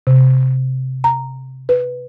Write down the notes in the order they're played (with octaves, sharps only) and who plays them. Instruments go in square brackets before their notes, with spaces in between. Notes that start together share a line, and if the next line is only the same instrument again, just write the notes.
[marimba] C3
A#5
B4